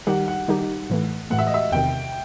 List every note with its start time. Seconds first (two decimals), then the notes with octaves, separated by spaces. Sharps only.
0.07 D#3 G3 D#4 G4 F#5
0.28 F#5
0.48 D#3 G3 D#4 G4
0.90 A2 E3 A3
1.30 A2 E3 A3 F#5
1.39 E5
1.47 D#5
1.54 E5
1.72 E2 C3 D#3 G5